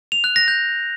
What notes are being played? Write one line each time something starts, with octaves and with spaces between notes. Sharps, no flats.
F7
F#6
A#6
G6